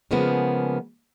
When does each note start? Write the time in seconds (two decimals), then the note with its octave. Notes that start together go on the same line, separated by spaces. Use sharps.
0.11 C#3 F3 G#3 A#3 B3